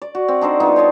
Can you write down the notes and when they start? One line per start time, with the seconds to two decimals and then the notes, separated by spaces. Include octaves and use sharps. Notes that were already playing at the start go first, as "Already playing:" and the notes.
0.02 D5
0.15 F#4
0.28 C4
0.41 D4 D#4 A4 C5
0.60 G3 B3 D#4 F4
0.76 C5 C#5 D#5 A5